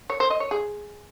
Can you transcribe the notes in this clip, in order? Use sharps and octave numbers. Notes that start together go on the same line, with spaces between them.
C#5
C5
D#5
C#5
G#4